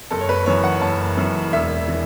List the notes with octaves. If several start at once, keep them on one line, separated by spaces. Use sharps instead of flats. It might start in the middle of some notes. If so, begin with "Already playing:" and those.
F#1 A4
C#5
B4
F#2 E3 C#5
F#5
F#1 A5
F#2 E3
E1 E5
E3